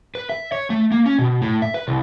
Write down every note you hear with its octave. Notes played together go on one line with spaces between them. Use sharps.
B4
E5
C#5
A3
A#3
C#4
B2
A2
E5
B4
C2